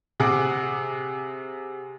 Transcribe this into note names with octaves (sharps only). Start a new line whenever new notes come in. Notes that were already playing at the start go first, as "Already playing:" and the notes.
C3 G#4 F#5 D6